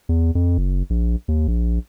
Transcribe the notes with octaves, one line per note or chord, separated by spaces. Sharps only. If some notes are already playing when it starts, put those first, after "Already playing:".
E2
F2
F#1
A#1
D#2
A#1